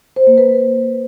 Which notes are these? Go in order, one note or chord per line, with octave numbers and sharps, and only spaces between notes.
C5
A#3
B4